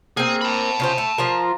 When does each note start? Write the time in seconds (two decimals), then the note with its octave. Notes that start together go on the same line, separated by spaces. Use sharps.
0.17 A#3 C4 G#4
0.41 A5 B5
0.80 C#3 F4 C5
0.98 A3
1.18 F3 F4 A#4